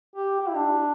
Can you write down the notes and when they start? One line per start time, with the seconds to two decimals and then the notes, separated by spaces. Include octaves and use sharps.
0.16 G4
0.40 G4
0.48 E4
0.56 D4